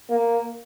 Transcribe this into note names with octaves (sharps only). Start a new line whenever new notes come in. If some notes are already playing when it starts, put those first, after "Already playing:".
A#3